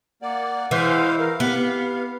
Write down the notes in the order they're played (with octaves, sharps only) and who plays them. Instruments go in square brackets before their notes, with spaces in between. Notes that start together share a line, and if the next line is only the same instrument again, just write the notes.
[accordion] A#3 D5 [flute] F#5
[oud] E3 [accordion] G#3 C5 F5
[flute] A#4 [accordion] F5
[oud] B3 [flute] G4